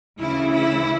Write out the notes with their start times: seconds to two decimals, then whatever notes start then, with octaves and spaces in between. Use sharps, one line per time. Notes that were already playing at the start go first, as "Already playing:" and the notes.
0.19 D2 C#3 E3 E4
0.51 E4